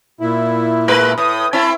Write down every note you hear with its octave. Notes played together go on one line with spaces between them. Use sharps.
A#2 E4
G#3 A#4 B4
A2 D#6
C4 E4 A5 B5